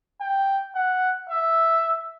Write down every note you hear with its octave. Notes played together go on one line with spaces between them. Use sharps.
G5
F#5
E5